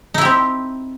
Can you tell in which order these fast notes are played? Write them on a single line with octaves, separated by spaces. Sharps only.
D#4 E4 G4 C4